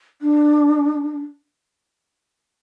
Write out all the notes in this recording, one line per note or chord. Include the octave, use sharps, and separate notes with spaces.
D4